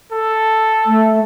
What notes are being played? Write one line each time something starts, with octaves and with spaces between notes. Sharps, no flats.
A4
A3